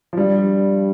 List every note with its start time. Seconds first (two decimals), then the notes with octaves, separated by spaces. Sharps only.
0.13 F3
0.17 G2 G3